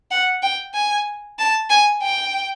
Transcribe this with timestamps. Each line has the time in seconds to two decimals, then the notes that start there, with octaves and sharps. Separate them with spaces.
0.11 F#5
0.43 G5
0.75 G#5
1.39 A5
1.70 G#5
2.03 G5